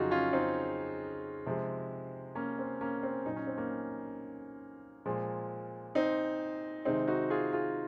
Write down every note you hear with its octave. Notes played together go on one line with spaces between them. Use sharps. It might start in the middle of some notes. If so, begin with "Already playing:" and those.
Already playing: F2 C#3 F#3 D#4 F4 F#4 G#4
C#4 F4
C4 D#4
C3 F3 G#3
A#3 C#4
C4
A#3 C#4
C4
A#2 F#3 D#4
C#4
C4
A#3 C#4
A#2 F3 G#3
C4 D#4
C3 D#3 G#3 C4 D#4
D#4 F#4
F4 G#4
F4 G#4